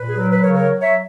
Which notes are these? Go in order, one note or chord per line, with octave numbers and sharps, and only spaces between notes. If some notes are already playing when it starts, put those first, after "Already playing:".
Already playing: A#2 B4
G#4
F#3 A#4
B4
C#3 A#4 C#5
A#4 C#5
F#3
C#5 E5